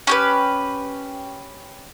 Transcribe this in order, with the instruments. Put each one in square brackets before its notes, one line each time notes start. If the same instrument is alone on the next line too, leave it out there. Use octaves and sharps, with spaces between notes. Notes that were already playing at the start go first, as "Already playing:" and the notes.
[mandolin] C#4 G4 B4